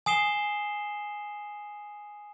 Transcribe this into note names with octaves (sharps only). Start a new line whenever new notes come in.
G#5 D#6 C7 E7 G7